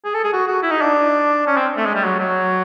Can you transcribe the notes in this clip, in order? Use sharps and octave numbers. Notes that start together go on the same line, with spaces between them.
G#4
A4
G#4
F#4
F#4
E4
D#4
D4
C#4
C4
A3
G#3
G3
F#3
F#3